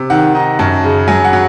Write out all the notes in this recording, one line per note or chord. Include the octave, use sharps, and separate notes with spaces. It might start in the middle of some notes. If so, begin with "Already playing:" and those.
Already playing: C3
D#3 F#5
D#4
F#2 A5
C#3
F#3 G#5
F#5
F#3